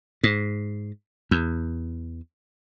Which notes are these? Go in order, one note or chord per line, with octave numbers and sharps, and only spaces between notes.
G#2
E2